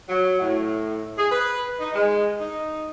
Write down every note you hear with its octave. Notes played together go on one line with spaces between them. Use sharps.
F#3
A2
G#4
B4
D#4
G#3
D#4